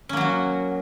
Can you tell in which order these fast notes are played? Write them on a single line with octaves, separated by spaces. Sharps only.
C#4 A#3 F#3 F#4